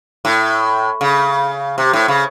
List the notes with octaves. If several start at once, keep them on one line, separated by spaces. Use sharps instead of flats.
A2
C#3
C3
A2
C#3